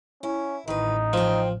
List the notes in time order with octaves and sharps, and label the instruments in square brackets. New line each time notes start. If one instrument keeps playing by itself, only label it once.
[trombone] C#4 [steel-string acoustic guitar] E4
[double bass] A1 [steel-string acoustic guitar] D#3 B4 [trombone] D#4
[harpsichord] F3 [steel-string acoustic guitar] C5 G5